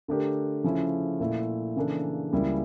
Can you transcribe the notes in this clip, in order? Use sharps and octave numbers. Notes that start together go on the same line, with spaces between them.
D3 A3 D4 G4 A#4
C#3 F3 A3 C#4 E4
A#2 A3 E4
C#3 E3 A#3 D4 A4
C#2 C#3 G3 A#3 E4